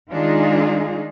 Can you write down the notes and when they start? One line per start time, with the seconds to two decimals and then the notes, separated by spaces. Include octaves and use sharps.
0.12 D#3 G#3 D4 D#4 F4 G#4